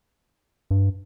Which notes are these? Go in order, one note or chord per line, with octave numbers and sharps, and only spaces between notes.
G2